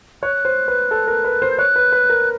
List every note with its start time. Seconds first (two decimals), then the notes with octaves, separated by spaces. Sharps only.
0.23 C#5 F#6
0.45 C5
0.68 B4
0.91 A4
1.07 A#4
1.24 B4
1.42 C5
1.50 G6
1.58 C#5 F#6
1.76 B4
1.92 B4
2.10 A#4